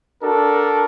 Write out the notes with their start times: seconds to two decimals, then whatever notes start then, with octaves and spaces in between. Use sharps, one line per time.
0.23 D4 F#4 A4 A#4